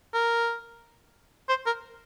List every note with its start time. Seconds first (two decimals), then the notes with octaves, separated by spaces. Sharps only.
0.14 A#4
1.49 C5
1.66 A#4